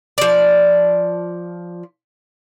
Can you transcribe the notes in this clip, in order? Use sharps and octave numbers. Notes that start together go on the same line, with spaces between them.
F3 D5